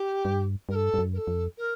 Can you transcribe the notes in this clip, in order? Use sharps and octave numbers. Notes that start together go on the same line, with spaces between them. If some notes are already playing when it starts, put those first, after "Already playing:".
Already playing: G4
G2
G2 A#4
A4
G2
F#2
A#4
A4
F2
A#4